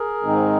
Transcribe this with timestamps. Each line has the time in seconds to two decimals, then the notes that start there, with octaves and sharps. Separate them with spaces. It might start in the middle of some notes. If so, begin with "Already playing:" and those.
Already playing: G#4 A#4
0.22 G#2 D#3 G#3 C4 D#4